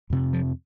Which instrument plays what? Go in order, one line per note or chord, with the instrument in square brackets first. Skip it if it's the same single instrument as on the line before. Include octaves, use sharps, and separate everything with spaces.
[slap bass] F2 C3
F3